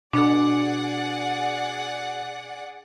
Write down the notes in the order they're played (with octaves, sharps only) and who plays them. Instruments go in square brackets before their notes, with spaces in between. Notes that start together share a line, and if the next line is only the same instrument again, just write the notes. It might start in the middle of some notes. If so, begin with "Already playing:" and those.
[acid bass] B2 [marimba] D4 A4 [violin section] G#4 D5 F#5